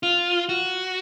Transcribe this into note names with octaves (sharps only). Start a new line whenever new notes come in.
F4
F#4